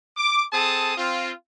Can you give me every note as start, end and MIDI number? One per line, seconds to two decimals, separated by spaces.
0.17 0.42 86
0.53 0.94 60
0.53 0.94 68
0.53 0.94 69
0.53 0.94 81
0.53 0.94 87
0.97 1.32 60
0.97 1.32 65